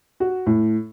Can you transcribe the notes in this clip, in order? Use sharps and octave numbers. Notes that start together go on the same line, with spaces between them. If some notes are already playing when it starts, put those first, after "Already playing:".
F#4
A2